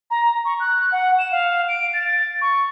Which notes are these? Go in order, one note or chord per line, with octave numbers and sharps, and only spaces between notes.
A#5
C#6
F#6
F#5
E7
F5
D7
A6
C#6